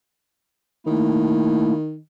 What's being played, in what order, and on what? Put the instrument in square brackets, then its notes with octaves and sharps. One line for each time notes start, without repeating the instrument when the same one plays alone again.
[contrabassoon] D#3 [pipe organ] A3 A#3 E4